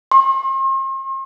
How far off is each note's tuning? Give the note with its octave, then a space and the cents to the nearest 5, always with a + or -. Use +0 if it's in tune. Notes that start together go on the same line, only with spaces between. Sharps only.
C6 +45